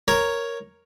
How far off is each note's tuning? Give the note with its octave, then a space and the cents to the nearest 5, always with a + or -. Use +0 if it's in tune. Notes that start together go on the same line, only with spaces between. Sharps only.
A#4 +0 C#5 +0 A#5 +0